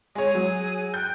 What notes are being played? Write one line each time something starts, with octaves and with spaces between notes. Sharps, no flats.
G#3 G#4 C#5 G#5 D#6
F#3
G5 F#6 G6